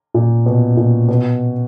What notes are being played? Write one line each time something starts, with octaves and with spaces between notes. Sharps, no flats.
A#2
B2
A#2
B2